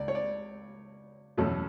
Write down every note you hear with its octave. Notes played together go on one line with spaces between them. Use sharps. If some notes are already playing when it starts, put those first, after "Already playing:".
Already playing: C#2 D5
C#5
D5
E2 B2 F#3 A3 C#4